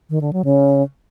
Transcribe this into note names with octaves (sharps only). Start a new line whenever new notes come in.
D#3
D3
F#3
C#3